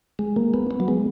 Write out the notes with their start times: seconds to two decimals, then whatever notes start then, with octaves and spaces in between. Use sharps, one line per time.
0.19 G#3
0.36 A#3
0.54 B3
0.71 B3
0.80 F#3
0.88 G#3